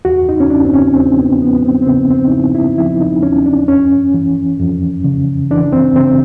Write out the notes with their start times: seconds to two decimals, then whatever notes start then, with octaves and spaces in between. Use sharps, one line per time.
0.05 E2 F#4
0.29 D#4
0.40 C#4
0.50 E2 D4
0.65 C4
0.73 C#4
0.96 E2 C4
1.18 B3
1.42 F3 B3
1.55 B3
1.65 C4
1.82 C4
1.87 C#3 B3
2.10 C4
2.27 D#4
2.32 C#3 E4
2.55 E4
2.78 F3 E4
3.01 D#4
3.23 E2 C#4
3.46 D4
3.68 F2 C#4
4.14 E3
4.60 F2
5.04 C#3
5.51 E3 D4
5.73 C4
5.96 C#3 C4